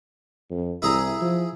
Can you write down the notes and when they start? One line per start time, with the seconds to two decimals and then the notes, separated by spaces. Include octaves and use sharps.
0.51 F2
0.82 C2 E4 G#4 A#5
1.21 F3